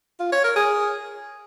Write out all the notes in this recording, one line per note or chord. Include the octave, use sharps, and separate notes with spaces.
F4
C#5
A#4
G#4